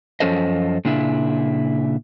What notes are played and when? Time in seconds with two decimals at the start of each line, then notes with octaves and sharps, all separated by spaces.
0.20 F#2 F3 C#4 A4 C5 D#5
0.85 A#2 C#3 D4 E4